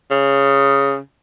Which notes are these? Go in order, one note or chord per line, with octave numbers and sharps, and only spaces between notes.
C#3